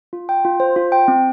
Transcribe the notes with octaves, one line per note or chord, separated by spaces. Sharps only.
F4
G5
F4
C5
F4
G5
C4